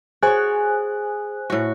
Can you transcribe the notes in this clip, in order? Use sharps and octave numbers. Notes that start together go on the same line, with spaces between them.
F#4 G#4 C5 C#5 G#5 F#6
A2 F#4